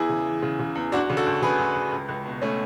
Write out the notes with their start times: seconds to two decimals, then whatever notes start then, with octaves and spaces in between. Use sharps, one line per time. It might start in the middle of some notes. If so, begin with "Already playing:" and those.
Already playing: E2 E4 G#4
0.09 C#3
0.26 E3
0.42 C#3
0.59 C#3
0.75 E2
0.92 D2 D4 F#4
1.10 C#3
1.17 F#4 A4
1.26 D2
1.42 C#3 G#4 B4
1.59 D2
1.76 D2
1.92 C#2
2.09 C#2
2.26 B2
2.41 B2 A3 C#4